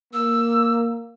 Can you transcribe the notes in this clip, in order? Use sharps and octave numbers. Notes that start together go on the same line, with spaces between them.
A#3 E6